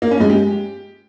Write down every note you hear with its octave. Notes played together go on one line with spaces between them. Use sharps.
A#3
C#4
G#3
G4